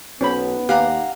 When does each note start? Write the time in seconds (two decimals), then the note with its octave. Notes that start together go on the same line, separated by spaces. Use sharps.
0.21 B1 B3 C#4 C5 B5
0.69 D#2 G4 F5 F#5 A#5